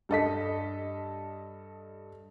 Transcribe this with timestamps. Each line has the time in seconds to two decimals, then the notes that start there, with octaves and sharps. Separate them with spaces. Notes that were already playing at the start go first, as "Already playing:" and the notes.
0.09 G2 A4 D#5 B6